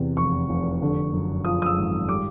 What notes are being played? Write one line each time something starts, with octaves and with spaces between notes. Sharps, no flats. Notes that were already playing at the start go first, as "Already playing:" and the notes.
Already playing: E2 C3
F1 C#6
F1
D3
F#2
F3 D#6
D#6
E6
G#1
G3 D6